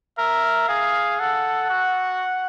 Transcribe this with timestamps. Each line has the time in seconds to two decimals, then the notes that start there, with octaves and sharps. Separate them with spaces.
0.18 A#4 E5
0.68 G#4 F5
1.19 A4 F#5
1.70 F#4